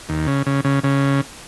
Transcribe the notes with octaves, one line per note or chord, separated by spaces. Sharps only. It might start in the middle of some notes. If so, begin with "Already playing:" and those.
D#2
C#3
C#3
C#3
C#3